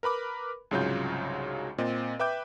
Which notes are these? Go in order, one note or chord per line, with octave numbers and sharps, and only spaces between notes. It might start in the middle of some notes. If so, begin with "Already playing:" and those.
A#4 B4 B5 D6
C2 G#2 C#3 F#3 F4 G6
A#2 C4 D#5
B4 E5 G5 D6 G6